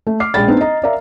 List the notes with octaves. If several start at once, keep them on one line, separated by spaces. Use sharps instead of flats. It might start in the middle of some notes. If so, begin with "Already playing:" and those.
A3
D6 F6 C7
A#1 G#3 D5 G5 B5 A6
B3 C4 D4 D#4
D#5 A#5
A#4 D5 E5 F5 A#5